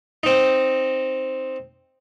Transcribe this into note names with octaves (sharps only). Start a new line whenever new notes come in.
C4 D#4